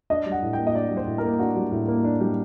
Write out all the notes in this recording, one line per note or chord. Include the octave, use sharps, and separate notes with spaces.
D4 D#5
G3
F#5
A2
G5
A#3
D#5
D4 D5
G3
C5
A2
A#4
A#3
D4 F#4
G3
A2
A#3
D4
G3